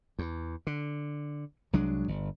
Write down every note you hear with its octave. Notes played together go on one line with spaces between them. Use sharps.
E2
D3
C2 F#3 G#3 D4
G1